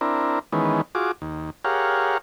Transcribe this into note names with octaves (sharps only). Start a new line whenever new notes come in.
C4 D4 E4 A#4
D#3 E3 G#3 B3 C#4
F4 F#4 G#4 D6
D#2
G4 G#4 A#4 C#5 F5 F#5